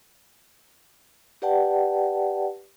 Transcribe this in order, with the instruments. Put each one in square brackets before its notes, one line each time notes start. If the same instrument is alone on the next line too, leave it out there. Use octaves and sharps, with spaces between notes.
[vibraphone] G4 B4 D5 F#5 G5 A5